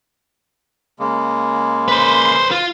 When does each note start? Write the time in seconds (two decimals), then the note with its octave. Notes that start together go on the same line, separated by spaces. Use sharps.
0.99 C#3 G#3 A#3
1.88 B4 C5
2.51 F4